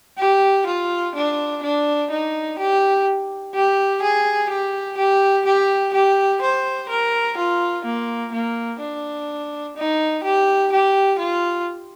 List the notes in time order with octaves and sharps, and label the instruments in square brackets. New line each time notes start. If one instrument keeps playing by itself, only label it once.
[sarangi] G4
F4
D4
D4
D#4
G4
G4
G#4
G4
G4
G4
G4
C5
A#4
F4
A#3
A#3
D4
D#4
G4
G4
F4